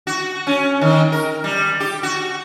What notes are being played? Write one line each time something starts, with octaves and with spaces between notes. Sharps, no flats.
F#4
C#4
D#3
A#4
G3
G4
F#4